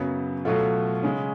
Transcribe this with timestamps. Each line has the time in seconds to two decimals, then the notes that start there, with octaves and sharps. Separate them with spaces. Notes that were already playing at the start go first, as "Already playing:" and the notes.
Already playing: F#2 C#3 F#3 B3
0.45 B2 F#3 A3 F4 A4
1.03 C#3 G#3 C#4